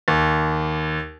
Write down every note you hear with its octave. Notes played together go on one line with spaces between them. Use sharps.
D#2